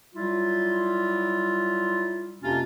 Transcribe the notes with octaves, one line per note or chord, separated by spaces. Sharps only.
F#3 G3 E4 F4
F2 C3 A#3 C#4 D4 F4